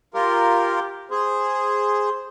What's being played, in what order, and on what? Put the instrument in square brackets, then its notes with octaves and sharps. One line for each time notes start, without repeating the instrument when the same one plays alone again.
[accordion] F4 A#4 [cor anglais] G4
[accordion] G#4 [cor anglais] C5